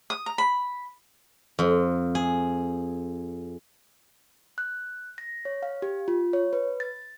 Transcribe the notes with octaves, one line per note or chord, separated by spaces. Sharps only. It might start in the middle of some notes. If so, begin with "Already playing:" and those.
D#6
A#5
B5
F2
G#4
F#6
A#6
C#5
F5
G4
F4
C#5
B4
A6